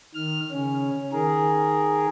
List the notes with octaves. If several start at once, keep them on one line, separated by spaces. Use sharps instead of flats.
D#3 F6
C#3 C#4
D#3 G#4 A#4